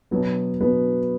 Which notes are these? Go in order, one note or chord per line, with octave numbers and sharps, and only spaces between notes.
B2 F#3 B3
B2 F#3 B3